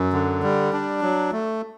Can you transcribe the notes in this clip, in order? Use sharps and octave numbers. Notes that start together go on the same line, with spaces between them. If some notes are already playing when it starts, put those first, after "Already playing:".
Already playing: F#2
D3
G3
D4
F#3
A3